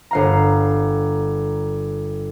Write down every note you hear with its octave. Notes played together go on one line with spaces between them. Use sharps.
G1 F5 A#5